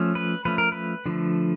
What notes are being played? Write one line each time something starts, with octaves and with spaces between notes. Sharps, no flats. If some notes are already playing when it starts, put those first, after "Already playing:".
Already playing: F3 A3 C#4
B4
F3 A3 C#4 B4
A#4
B4
D3 F3 A3